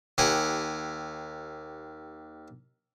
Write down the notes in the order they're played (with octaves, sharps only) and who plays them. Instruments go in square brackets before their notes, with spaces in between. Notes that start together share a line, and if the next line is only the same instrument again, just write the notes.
[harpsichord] D#2 G4 F#5 G#5